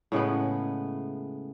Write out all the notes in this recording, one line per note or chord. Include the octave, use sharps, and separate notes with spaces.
A2 C#3 G#3 B3